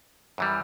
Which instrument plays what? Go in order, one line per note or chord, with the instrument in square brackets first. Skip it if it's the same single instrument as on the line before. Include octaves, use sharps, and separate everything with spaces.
[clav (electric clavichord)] F#2 E3 G3